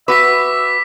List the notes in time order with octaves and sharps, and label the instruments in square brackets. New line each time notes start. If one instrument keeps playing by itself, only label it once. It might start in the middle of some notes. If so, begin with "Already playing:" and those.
[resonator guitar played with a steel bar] F#4 B4 [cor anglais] E5 [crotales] D6 B6